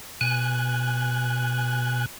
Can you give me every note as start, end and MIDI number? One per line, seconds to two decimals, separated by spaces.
0.21 2.06 47
0.21 2.06 80
0.21 2.06 90